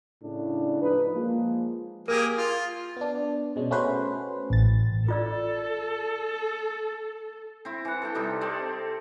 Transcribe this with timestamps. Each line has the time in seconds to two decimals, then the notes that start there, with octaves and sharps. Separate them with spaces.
0.23 A2 C#3 D4
0.82 F3 D#4 B4
1.15 F3 G#3 A#3
2.08 A#3 G4 G#4 A#4
2.38 F4
2.97 B3 D4
3.56 B2 G#3 C#4
3.71 A3 C#4 F#4 B4 C5
4.50 A1 A6
5.08 F4 A4 D5 E6
7.65 C4 E4
7.85 E3 F#5
8.02 A4 E5 G5
8.15 C3 G3 D#4 G4
8.41 C4 A4 D5